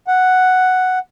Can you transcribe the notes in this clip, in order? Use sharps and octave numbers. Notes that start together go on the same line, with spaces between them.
F#5